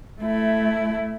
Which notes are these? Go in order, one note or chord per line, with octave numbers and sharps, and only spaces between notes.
A3 E4